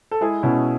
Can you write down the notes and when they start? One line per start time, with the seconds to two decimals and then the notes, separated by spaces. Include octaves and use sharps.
0.11 A4
0.21 G#3 E4 G#4
0.43 B2 C#4 E4